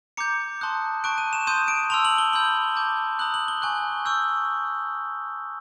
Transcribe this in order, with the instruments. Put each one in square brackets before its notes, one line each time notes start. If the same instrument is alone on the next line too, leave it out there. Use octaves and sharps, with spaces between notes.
[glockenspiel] A#5 D6 G6 C#7
A5 C6 D#6 F#6
A5 C#6 F#6 D7
D#7
E7
C6 D#6 G6 D#7
D7
A5 C6 E6 F7
F#7
G7
B5 E6 G6 F#7
A5 D6 G6
A#5 D#6 F#6 F#7
F#7
G7
G#5 C#6 F#6 G7
C#6 E6 G6